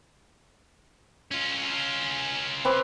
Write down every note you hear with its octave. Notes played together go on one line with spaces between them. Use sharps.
C#4 F4
C4 B4 D6